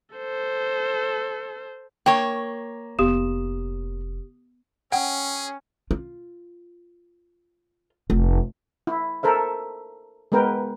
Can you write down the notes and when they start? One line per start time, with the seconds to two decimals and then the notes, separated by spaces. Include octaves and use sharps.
0.16 A4 C5
2.06 A#3 C#5 G5
2.99 F1 B3 G4 D#6 E7
4.92 C#4 G#4 F#5 G5
5.91 F4
8.10 F1
8.87 E4
9.23 A4 A#4 C5 E5
10.32 G#3 B3 A#4 B4 G5